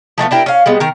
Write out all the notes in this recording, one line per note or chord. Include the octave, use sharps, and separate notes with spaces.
F3 G#3 A3 B3
D4 E4 G4 A#4
C#4 F5
G3 G#3 B3
D#3 A#4